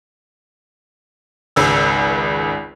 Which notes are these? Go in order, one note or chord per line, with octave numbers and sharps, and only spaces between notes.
G#1 C#2 E6